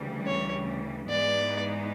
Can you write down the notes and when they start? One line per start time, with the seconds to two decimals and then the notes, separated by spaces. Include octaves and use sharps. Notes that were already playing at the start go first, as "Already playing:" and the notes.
Already playing: D2 C#3 E3 G3
0.26 C#5
1.09 G#2 E3 G#3 B3 D#4 D5